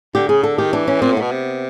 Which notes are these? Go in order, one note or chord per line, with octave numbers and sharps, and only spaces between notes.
D3 G4
C#3 G#4
D3 A4
D#3 G4
E3 D4
C#4
A#2 C4
A2
B2 B3
C3